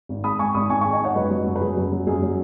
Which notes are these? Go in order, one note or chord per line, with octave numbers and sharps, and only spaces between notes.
G#1
G#3 B5 D#6
G#2 G#5 C#6
G#1 B5 D#6
G#1 G#5 C#6
G#5 C#6
G#3
D#5 G#5
G#2 C#5 F#5
F#2 B4 D#5
F#3
F#2
B4
F#3 G#4
F#2
F#3
F#2 G#4
F#3